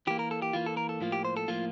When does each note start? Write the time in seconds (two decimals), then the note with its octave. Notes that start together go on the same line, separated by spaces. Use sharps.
0.07 E3 A#3 G4
0.19 A#4
0.31 A4
0.42 G4
0.53 E3 A#3 F4
0.66 A4
0.77 A#4
0.89 A4
1.01 A2 F3 A#3 F4
1.12 G4
1.25 C5
1.37 A4
1.48 A2 F3 A#3 F4